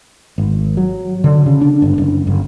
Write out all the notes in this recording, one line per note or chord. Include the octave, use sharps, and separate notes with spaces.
G#1
F#3
D3
C#3
D4
G1
F#1
G1